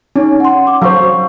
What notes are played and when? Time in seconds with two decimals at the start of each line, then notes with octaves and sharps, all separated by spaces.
0.16 C#4 D#4
0.40 F#5 C6
0.67 D6
0.82 F#3 C5 F5 C#6